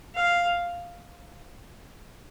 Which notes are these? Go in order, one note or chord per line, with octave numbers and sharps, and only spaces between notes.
F5